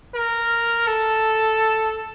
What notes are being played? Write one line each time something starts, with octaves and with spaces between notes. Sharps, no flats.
A#4
A4